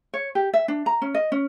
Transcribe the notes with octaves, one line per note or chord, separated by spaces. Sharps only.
C#5
G4
E5
D4
A#5
C#4
D#5
C#4